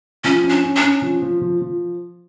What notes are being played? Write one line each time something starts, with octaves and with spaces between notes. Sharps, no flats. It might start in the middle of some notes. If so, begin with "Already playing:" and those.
F3 C#4
C#4
D4
C#4
D4
C#4
F3
F3
F3
F3